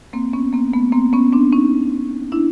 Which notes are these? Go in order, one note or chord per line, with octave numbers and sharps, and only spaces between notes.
A#3 C4
B3 C#4
A#3 C4
A3 B3
A#3 C4
B3 C#4
C4 D4
C#4 D#4
D4 E4